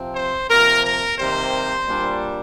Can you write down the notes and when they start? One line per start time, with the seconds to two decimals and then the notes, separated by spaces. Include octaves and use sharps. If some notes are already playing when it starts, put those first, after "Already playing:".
Already playing: C3 F3 C4
0.14 C5
0.48 C3 F3 A#3 A#4
0.83 A#4
1.17 C3 D#3 G3 A#3 C5
1.87 A#2 G3 D4